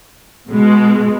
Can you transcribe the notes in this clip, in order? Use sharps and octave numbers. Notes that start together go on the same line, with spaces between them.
B2 G#3